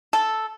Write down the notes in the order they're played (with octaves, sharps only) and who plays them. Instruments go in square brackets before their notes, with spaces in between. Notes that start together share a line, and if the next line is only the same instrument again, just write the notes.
[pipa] A4